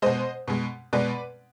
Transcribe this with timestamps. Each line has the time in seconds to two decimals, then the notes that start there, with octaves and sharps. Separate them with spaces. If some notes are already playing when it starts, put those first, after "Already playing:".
0.02 B2 G#3 C5 D#5
0.48 B2 G#3
0.93 B2 G#3 B4 D5